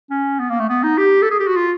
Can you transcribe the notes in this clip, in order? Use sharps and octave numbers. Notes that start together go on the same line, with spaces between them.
C#4
B3
A#3
A3
B3
D#4
G4
A4
G#4
G4
F#4
F4